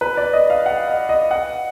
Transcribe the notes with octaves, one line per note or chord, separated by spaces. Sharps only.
B4
D5
D#5
F5
F#5
D#5
D#5
F#5